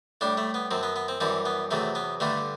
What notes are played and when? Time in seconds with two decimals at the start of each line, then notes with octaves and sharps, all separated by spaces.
0.21 A2 G3 D4
0.37 A3
0.54 B3
0.71 F#2 F#3 C4
0.83 B3
0.96 B3
1.08 C4
1.20 F#2 E3 G3 C4
1.45 B3
1.71 E2 C3 F#3 A3
1.95 B3
2.20 G2 D3 G3 A3